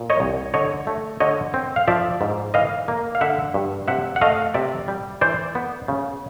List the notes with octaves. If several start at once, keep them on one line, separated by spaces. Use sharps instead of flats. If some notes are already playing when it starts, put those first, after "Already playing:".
Already playing: A#2
C#5 D#5
C2
D3 C#5 D#5
A3
D3 C#5 D#5
C4
F5
F3 D5 E5
G#2
E3 D#5 F5
A#3
F5
D3 E5 F#5
G2
C3 E5 F#5
F#5
A3 D#5 F5
C3 D5 E5
G3
E3 C5 D5
B3
C#3